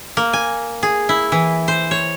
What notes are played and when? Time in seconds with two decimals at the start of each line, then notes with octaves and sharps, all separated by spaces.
0.17 A#3
0.33 G#5
0.83 G#4
1.09 E4
1.32 E3
1.68 C5
1.91 C#5